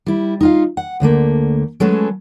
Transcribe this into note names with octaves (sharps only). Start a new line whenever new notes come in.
G3 E4
D#4 F4 F5
F#5
D2 D3 A3 A#3
F#3 G#3 A3 C#4 A4 B4